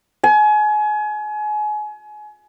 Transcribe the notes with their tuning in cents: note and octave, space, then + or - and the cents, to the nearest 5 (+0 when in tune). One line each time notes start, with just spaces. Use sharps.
G#5 +30